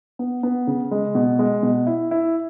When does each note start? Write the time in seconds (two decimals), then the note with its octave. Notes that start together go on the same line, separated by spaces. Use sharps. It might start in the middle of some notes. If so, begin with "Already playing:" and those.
0.19 B3
0.43 B3
0.67 C#3
0.91 G#3
1.15 B2
1.39 G#3
1.63 B2
1.87 E4
2.11 E4